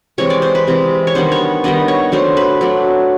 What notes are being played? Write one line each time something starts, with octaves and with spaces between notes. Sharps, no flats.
C3 E3 G#3 C#5
D5
C5
B4
C3 E3 G#3
C#5
D#3 G3 B3 D4 C5
C#5
D#3 G3 B3 D4 D#5
C#5
F#3 A3 D4 C5
B4
F#3 A3 D4